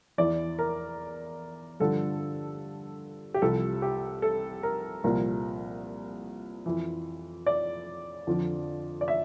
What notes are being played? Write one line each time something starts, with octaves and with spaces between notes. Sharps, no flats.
E2 E3 D5
A#4
G2 D3 F3 A4
G4
C2 C3 F3 A4
G4
A4
A#4
C2 A#2 F3 A#4
F2 E3
D5
F2 D3 F3
D5
E5